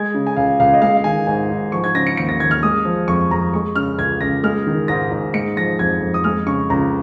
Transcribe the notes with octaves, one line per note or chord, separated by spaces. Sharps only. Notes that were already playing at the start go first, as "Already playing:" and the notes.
Already playing: G#3 G#6
C#3
G#5
C#2 F5
C#2 F5
D#5
G#3 F5
F5
D#3 G#5
G#2 G#5
G#2
F3 C#6
G#6
C#3 A#6
C#7
D#2 C#7
A#6
D#2 G#6
F6
G#3 D#6
F3
F2 C#6
F2 A#5
G#3 C#6
C#3 F6
C#2 G#6
C#2 A#6
G#3 F6
D#3
G#2 A#6
G#2
G#3 C#7
F3 A#6
F2 G#6
F2
D#6
G#3 F6
C#3 C#6
C#2 A#5